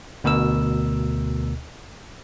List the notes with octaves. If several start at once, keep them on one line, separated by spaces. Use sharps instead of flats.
D2 B2 A#4 E6